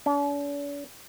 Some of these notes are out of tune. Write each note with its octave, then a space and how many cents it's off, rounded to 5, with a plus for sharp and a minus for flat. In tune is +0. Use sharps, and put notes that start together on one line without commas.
D4 -45